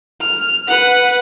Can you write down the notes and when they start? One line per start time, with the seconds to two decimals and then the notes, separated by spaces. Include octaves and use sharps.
0.21 F6
0.68 B4 F#5